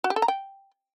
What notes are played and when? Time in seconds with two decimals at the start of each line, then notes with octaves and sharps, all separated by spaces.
0.04 F#4
0.10 G4
0.16 A4
0.22 A#5
0.28 G5